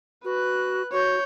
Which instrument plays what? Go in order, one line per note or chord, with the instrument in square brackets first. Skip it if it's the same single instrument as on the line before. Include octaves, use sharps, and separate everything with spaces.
[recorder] F#4 [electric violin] B4 F#6
[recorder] F#4 [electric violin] C#5 G6